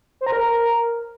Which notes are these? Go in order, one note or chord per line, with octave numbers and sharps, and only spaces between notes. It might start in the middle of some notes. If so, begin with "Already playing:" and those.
C5
A#5
A#4